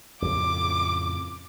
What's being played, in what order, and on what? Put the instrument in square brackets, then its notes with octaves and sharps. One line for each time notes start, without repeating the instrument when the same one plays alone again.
[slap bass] F2 A2 C#3 [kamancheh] D6